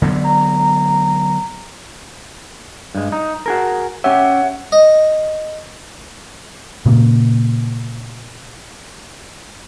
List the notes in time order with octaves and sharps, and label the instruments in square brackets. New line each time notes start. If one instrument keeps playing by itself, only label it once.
[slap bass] D3 F#3 B3
[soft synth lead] A#5
[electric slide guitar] G2 G#3
D#4
F#4 G#4 A#4
[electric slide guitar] C#4 G4 E5 [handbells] C#5 F#5
[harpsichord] D#5
[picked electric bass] A#2 C#3 A#3